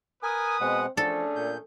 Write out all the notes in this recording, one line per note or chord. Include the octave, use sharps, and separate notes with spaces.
A#4 B4 G#5 D#6
B2 G#3 C4 F#5
F3 A3 C#4 D4 G#4 A4
A#2 G6